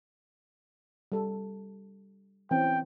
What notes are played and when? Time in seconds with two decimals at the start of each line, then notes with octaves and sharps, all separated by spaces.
1.12 G3 A4
2.51 E3 C4 C#4 G5